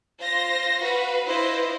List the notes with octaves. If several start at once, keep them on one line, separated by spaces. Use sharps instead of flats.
F4 C5 A#6
F#4 B4 F5
E4 F4 B4 C5 D#5